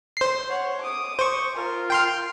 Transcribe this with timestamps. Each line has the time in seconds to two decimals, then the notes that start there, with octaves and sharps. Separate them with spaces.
0.17 C5 C7
0.49 C#5 F#5
0.80 D6 D#6
1.19 C5 C#6
1.55 F4 A#4
1.90 G5 C6 F6